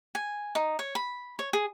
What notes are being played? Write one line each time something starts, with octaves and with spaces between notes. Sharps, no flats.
G#5
D#4
C#5
B5
C#5
G#4